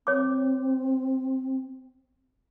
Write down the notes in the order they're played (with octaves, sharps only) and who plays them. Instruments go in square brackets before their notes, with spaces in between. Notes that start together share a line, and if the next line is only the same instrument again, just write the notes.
[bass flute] C4 [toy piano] C#5 D6